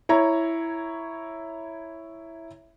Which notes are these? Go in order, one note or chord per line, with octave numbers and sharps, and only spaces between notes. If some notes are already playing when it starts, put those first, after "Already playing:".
E4 C#5 A#5